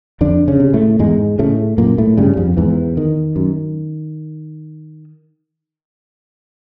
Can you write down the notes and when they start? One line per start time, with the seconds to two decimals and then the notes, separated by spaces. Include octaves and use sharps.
0.21 F2 D3 D4
0.48 C#3 C#4
0.60 C3
0.74 A2 A3
0.99 E2 G#2 G#3
1.39 A2 C#3 A3
1.78 F#2 A#2 A#3
1.98 A2 A3
2.17 G2 C#3 G3
2.37 F2 F3
2.57 E2 G#2 E3
2.97 D#3
3.36 F#2